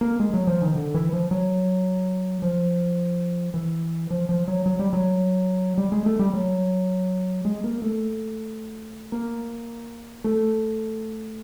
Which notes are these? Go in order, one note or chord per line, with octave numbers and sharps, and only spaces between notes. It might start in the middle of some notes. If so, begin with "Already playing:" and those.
A#3
G#3
F#3
F3
D#3
D3
E3
F3
F#3
F3
E3
F3
F3
F#3
F#3
G3
F#3
G3
G#3
A3
G3
F#3
G#3
A#3
A3
A#3
A3